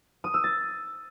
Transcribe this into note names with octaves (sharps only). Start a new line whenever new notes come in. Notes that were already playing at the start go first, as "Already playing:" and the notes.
D#6
E6
A6